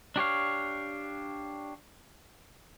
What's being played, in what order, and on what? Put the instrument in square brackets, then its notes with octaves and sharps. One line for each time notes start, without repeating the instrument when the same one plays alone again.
[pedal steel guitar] D4 G4 C#5 F5